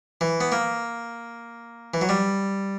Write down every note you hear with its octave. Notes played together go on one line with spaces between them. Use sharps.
E3
B3
A#3
E3
F#3
G3